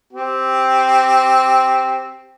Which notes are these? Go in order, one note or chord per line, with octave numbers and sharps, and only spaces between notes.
C4 G4